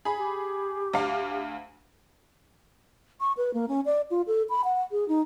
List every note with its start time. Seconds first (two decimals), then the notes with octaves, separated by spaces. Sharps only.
0.05 G#4 B5
0.18 G4
0.94 D2 F5
3.21 C#6
3.37 B4
3.54 A#3
3.68 C#4
3.86 D5
4.11 F4
4.27 A4
4.50 B5
4.65 F#5
4.92 G#4
5.08 D#4